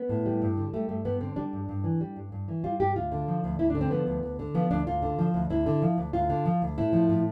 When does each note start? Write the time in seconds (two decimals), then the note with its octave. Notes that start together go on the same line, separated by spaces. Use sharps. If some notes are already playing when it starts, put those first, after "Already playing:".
Already playing: B3
0.09 A2
0.26 G3
0.42 G2
0.57 D3
0.73 G3 A3
0.89 G2 A3
1.05 G2 B3
1.21 D3 C4
1.36 G3 D4
1.53 G2
1.69 G2
1.84 E3
2.01 G3
2.16 G2
2.32 G2
2.48 E3
2.64 G3 F4
2.80 G2 G4
2.96 D2 F4
3.12 D3
3.28 F3
3.44 D2
3.59 D2 E4
3.70 D4
3.75 D3
3.81 C4
3.91 F3 B3
4.07 D2
4.23 D2
4.39 D3
4.54 F3 B3
4.71 D2 D4
4.87 D2 F4
5.02 D3
5.19 F3
5.34 D2
5.50 D2 E4
5.66 D3
5.82 F3
5.98 D2
6.13 D2 F4
6.30 D3
6.45 F3
6.62 D2
6.78 A2 E4
6.93 F3
7.09 A2